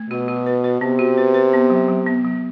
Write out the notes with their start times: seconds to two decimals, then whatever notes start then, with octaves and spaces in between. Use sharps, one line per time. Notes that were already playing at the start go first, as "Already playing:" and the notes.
Already playing: A3
0.10 B2 F#4
0.28 F#4
0.46 B4
0.64 B4
0.81 C3 B3
0.99 F#4
1.18 B4
1.34 B4
1.53 B3
1.70 F#3
1.89 F#3
2.06 B3
2.25 F#3